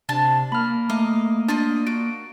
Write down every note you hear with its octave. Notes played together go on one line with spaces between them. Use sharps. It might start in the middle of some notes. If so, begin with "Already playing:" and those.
C3 D4 A5
A#3 B5 F6
A3 D#5 F5
D4 F4 D5 D#5
F#4 D7